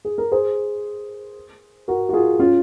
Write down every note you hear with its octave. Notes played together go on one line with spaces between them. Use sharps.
G#4
A#4
G#4 C5
F#4 A#4
F#4
F4 G#4
C#4 F4